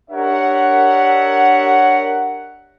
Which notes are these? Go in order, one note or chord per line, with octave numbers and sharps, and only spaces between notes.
D4 G4 A#4 C#5 E5 F#5